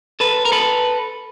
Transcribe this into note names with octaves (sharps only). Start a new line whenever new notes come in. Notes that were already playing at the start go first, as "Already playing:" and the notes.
A4 B4
A#4
A4 B4